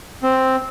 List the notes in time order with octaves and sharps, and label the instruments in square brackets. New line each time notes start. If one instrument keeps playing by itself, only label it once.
[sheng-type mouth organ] C4